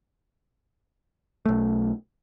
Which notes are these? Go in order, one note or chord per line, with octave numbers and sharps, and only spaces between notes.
B1 A3